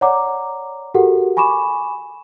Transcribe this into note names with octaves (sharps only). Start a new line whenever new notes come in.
C#5 D5 F#5 A#5 D6
F#4 G4 A4 A#4 F#5
G#5 B5 C#6 D6 E7